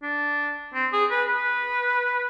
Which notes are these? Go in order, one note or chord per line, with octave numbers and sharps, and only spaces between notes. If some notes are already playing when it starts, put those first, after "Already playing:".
D4
C4
G#4
B4
B4